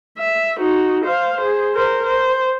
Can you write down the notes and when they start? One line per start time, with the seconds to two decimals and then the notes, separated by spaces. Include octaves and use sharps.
0.18 E5
0.59 D#4 F#4
1.05 C5 F5
1.37 G#4 C5
1.74 A#4 C5
2.06 C5